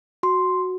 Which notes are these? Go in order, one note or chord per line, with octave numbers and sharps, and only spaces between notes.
F#4 C6